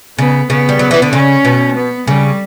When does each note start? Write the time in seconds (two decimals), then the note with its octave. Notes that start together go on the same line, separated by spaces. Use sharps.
0.18 C#3 B3
0.50 C#3 B3
0.69 G3
0.79 F#3
0.91 E3
1.02 D3
1.13 C#3 C#4
1.45 B2
1.76 B3
2.07 C#3 G3